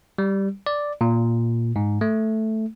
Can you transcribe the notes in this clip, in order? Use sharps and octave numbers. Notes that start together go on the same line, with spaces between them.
G3
D5
A#2
G#2
A3